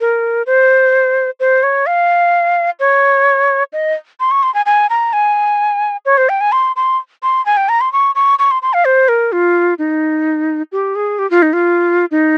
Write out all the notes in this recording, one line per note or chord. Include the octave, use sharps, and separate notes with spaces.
A#4
C5
C5
C#5
F5
C#5
D#5
C6
C#6
C6
G#5
G#5
A#5
G#5
C#5
C5
G5
G#5
C6
C6
C6
G#5
G5
A#5
C6
C#6
C#6
C#6
C6
C6
F5
C5
A#4
F4
D#4
G4
G#4
G4
F4
D#4
F4
D#4